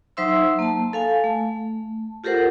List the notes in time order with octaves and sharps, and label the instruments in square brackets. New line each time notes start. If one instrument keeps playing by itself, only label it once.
[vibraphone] F#3 D#4 C5 E5 C6 E6
A#3 A5
A4 F5 G#5
A3
F4 G4 A4 A#4 C5 F#5